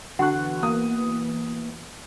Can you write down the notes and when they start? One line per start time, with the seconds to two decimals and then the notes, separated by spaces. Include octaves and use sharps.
0.19 D3 E3 B3 F#4 F#5 C#6 F#6
0.63 A#3 D#6